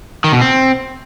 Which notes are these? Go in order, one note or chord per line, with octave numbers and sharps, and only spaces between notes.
D#3
B2
C4